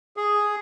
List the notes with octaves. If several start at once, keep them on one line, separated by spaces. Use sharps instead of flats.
G#4